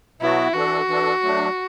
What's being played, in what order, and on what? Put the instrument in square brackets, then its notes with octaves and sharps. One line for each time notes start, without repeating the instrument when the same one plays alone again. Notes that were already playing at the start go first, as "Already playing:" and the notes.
[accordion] B2 F#3 B3 F#4 [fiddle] E4
[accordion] E3 D4 A4 [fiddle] F#4
[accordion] E3 D4 A4
F#3 A3 D4